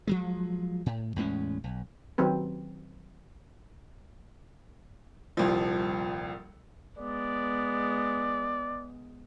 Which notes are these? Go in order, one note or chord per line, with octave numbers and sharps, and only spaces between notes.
F3 F#3 G#3
A2
E2 A2 G#3 C#4
B1
D#3 F#3 C4 B4
D#1 C2 F3
G#3 B3 D5